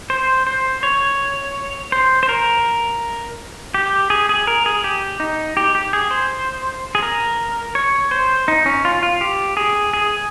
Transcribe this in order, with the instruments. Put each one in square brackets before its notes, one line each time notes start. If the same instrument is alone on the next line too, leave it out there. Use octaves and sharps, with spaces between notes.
[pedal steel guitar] C5
C5
C#5
C5
C5
A#4
G4
G#4
G#4
A#4
G#4
G4
D#4
G4
G4
G#4
C5
G#4
A#4
C#5
C5
D#4
C#4
F4
F4
G4
G#4
G#4